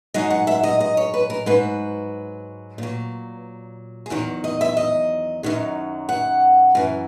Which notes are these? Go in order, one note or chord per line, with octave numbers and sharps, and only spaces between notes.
G#2 F#3 D#5
F#5
E5
D#5
D#5
C#5
B4
A#4
G#2 F#3 B4
A#2 F#3
G#4
E2 D#3 F#3 A#4
D#5
E5
D#5
F#2 D#3 F#3
F#5
F#2 E3